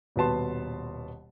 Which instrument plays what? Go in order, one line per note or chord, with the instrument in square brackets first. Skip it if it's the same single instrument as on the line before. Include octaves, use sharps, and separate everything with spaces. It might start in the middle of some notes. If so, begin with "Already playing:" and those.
[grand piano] D#1 B2 B3 A5 C6